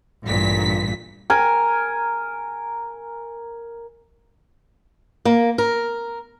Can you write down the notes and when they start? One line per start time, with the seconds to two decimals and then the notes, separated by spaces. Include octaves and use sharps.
0.24 A1 G2 A#2 B6
1.30 A#4 G#5
5.25 A#3
5.58 A#4